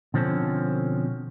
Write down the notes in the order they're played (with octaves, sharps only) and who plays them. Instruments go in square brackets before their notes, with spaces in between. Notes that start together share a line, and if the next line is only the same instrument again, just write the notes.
[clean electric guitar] B2 D3 F3 C4 C#4 A4